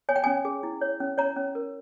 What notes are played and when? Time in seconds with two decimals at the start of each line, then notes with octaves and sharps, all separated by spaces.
0.09 C#5 G#5
0.16 G5
0.24 C#4 G#5
0.45 G#4
0.63 E4
0.81 C#5
1.00 C#4
1.18 C#5 A#5
1.36 C#4
1.55 A#4